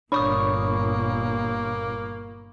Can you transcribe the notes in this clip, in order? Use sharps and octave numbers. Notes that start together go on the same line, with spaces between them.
G1 A#2 A#3 D4 C#5 B5 C#6 D#6